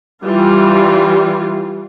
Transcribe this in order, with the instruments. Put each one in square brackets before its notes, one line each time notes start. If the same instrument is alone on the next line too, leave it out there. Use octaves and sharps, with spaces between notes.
[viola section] E3 G3 F4